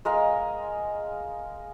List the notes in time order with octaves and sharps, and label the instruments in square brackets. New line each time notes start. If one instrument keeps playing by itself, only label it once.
[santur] G#3 A#4 F5